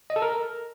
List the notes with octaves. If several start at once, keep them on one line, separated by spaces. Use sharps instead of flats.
D#5
A4
A#4